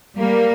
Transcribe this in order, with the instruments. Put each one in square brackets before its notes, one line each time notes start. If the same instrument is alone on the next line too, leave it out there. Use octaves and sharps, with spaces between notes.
[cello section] G3 A#3